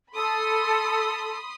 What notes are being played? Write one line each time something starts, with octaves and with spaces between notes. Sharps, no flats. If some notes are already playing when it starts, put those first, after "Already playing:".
A4 B5 C6 D#6